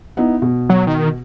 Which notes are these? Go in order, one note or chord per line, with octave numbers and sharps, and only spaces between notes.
B3 D#4 E4
B2
F#3
D#3